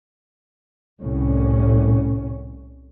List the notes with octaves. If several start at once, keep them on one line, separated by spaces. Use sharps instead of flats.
C2 A2 C#4